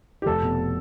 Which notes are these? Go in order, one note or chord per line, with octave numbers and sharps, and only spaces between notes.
G4
F1 A4
B2